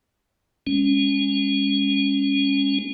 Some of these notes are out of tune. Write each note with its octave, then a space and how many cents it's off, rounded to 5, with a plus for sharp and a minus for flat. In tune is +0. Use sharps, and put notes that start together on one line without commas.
G#3 -30 C#4 +0